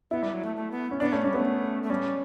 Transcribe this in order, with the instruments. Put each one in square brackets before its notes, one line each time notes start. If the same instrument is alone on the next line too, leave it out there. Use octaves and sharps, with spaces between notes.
[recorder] B3 [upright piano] E4
[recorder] G3
F#3
A3
A3
B3
[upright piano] C#4
[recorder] B3 [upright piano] D4
[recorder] A3 [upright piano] C#4
[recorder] G3 [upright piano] C#4
[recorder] A3 [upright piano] B3
[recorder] A3
[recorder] G3 [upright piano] C#4